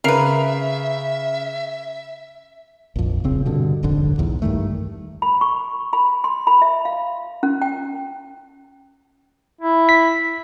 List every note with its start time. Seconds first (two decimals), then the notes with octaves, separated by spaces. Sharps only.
0.04 C#3 A#4 B4 E5 C7 F7
2.96 A#1 F2
3.24 D#1 C#3 C4
3.46 G2 B2 D3
3.83 D#1 G#1 F2 D3
4.18 B1 E2 G#2
4.42 G2 D#3 A3
5.22 B5
5.41 C#6
5.93 B5
6.24 C6
6.47 B5
6.62 E5
6.85 F5
7.43 C#4
7.62 G5
9.61 E4
9.89 B6